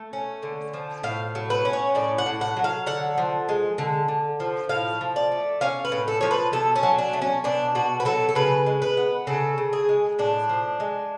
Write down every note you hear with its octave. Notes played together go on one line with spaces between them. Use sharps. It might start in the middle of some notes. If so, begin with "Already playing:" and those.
Already playing: A3
C#4
D3
F3
A2 F5
F#3
B4
C#4
C#5
A2 D5
F#5
A2
F#5
F#3
F5
D3 F#5
F3
G#3
D3
D3
F3
A2 F5
F3
D5
A3
C#4 F5
B4
A2
A4
F3 C#5
B4
B2 A4
C#4
F#3
D4
A3
C#4
B2 D4
B2 F#4
B4
F#3 A4
A4
C#3 B4
G#3
B4
B3
C#3 A4
C#3
G#4
G#3
A2 D4
F3
G#3